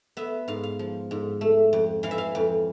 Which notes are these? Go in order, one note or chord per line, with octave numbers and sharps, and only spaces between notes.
B3 E5
G#2 F5
F5
F3
G#2
A3
F2
E3 F5
E5
F5
F2